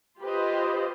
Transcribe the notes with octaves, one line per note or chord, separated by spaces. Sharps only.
F4 G4 B4 C5 D#5